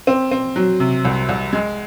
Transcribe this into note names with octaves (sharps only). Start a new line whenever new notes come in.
C4
C4
F#3
C3
C2
C2
G#3